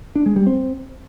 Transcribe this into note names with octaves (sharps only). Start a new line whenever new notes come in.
D4
G#3
G3
C4